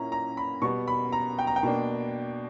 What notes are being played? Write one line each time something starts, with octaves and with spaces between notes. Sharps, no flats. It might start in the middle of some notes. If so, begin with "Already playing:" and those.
Already playing: A#2 A#3 C#4 E4 A#5
A#5
B5
B2 G3 B3 C#6
B5
A#5
G5
A#5
G5
B2 A#3 D4